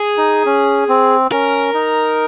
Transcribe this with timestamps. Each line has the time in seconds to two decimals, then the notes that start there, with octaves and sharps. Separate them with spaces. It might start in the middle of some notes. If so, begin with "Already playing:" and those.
Already playing: G#4
0.17 D#4
0.46 C#4
0.89 C4
1.32 C#4 A#4
1.74 D#4